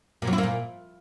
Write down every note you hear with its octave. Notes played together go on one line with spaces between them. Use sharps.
A#2
F#3
E4
A#3
A#2